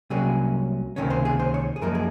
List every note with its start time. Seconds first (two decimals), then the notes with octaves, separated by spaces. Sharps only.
0.10 C2 C3 F#3 A#3 C#4 G#4
0.96 C#2 C3 D#3 A#3 C#4
1.10 C5
1.25 G#4
1.39 C5
1.54 C#5
1.76 G#4
1.82 F#2 F3 A#3 D#4 A#4
1.95 G#4